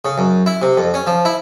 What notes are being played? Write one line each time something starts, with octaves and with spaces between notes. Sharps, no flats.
C#3
F#2
E4
C3
F2
C#4
F3
E4